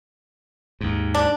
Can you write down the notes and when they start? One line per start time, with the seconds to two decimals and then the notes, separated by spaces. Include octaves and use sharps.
0.81 D#2 G#2
1.14 D4